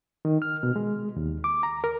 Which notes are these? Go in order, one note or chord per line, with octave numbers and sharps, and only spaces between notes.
D#3
F6
B2
G#3
D#2
D6
A#5
A#4